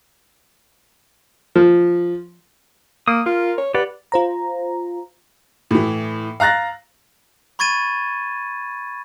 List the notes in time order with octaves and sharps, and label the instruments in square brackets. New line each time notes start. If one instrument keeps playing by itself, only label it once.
[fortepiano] F3
[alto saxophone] A#3 [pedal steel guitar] D#6
[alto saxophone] F4 [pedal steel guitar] A#4
[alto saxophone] C#5
[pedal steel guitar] G4 D5 F#5 [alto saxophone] B4
[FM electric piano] F4 C5 A#5
[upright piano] A2 E3
F5 A#5 F#6 A6 A#6
[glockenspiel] B5 C#6 G#6 A6 D#7